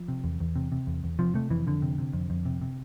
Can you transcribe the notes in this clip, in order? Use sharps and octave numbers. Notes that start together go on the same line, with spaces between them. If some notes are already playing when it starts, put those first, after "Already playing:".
Already playing: F3
C3
E2
E2
C3
C3
E2
E2
C3 F3
C3 A3
F2 E3
F2 D3
C3
C3
F2
F2
C3
C3